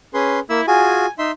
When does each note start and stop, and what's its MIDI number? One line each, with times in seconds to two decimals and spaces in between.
0.14 0.40 61
0.14 0.39 68
0.14 0.40 71
0.14 0.40 84
0.50 0.61 58
0.50 0.67 64
0.50 0.61 88
0.67 1.06 65
0.67 1.06 66
0.67 1.06 68
0.67 1.09 80
1.19 1.31 63
1.19 1.31 76
1.19 1.31 84